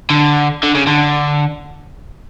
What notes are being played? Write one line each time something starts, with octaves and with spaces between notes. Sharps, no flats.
D3
D3
C#3
D3